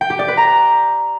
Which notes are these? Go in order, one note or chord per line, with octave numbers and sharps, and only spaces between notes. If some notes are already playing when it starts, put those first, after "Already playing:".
G5
G4
D5
B4
A#5